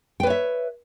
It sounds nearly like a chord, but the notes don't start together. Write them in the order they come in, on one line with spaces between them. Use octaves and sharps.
G5 B4 C#5 E5